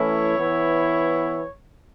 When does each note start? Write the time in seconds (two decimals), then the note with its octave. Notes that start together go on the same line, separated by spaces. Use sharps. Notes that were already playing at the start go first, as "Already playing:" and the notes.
Already playing: E3 A3 C#4 E4 C#5
0.37 E3 B3 E4